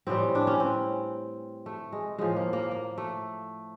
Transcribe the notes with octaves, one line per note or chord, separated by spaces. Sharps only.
A2 E3 G3 C4
D4
C#4
C4
A3
G#3
A2 F3 G#3
A#3
A#3
A#3
A3